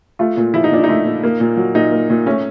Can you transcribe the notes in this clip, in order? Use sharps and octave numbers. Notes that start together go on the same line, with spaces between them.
A3 F4
A#2
F3 E4
D#4
A#2 D4
A3 D#4
A#2
A#3
A#2
F#3
A#2 D#4
A#3
A#2
A3 C#4